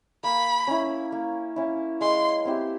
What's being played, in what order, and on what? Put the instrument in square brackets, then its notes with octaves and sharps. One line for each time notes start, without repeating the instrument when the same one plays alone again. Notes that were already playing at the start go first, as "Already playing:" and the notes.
[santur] A#3 [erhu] B5
[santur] C#4 E4
A#3
C#4 E4
[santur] G#3 [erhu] C6
[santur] C4 E4 G4